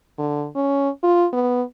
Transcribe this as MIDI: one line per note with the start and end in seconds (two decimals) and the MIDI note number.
0.19 0.47 50
0.55 0.89 61
1.03 1.26 65
1.33 1.62 59